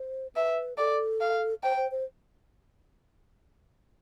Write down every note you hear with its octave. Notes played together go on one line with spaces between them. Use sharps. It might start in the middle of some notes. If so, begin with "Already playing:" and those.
Already playing: C5
B4 E5
A4 D5
F5
C5 G5
C5
C5